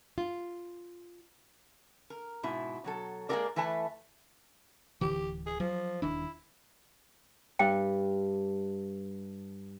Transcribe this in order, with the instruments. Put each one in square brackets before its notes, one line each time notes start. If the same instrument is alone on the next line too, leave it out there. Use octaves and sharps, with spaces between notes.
[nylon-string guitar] F4
[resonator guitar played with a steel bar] A#4
G#2 B2 E4
B2 F#3 A4
G#3 A#3 F#4 A4 A#4 D5
E3 A3 B4 G#5 A5
[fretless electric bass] D1 D3 E3 [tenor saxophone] G4
[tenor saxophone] G#4
[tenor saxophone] F3 [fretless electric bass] F#3
[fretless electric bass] D#1 D#3 D4 [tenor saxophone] E4
[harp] G2 [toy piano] G5